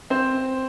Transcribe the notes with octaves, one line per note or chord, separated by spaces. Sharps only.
C4 C5